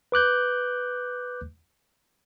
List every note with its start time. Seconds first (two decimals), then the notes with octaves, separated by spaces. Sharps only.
0.12 B4 D6 F#6 G6